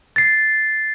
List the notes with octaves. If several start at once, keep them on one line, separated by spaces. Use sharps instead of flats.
A6 C7